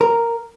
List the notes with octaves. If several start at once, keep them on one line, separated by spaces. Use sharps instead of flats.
A#4